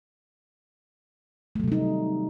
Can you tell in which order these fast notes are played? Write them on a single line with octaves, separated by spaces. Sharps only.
A3 F#3 C3 G3 D#4